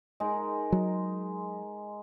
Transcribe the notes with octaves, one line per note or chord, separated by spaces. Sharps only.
G#3 D#4 A#4
F#3